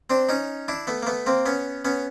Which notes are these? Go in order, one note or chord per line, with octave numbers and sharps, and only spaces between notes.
C4 D4
C#4 D#4
D4 E4
A3 B3
A#3
A3 B3
A#3 C4
B3 C#4
B3 C#4